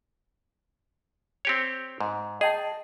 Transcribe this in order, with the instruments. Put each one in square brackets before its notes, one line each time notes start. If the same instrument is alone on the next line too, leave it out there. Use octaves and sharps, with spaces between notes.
[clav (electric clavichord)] C4 G4 C#5
G#2
[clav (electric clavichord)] G#4 [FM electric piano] D#5 G5 A5